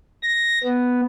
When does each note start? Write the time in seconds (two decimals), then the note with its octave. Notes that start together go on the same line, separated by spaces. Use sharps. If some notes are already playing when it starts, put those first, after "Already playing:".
0.23 A#6
0.64 B3